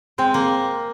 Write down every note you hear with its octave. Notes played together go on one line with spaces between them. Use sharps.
G#3 C4
A#3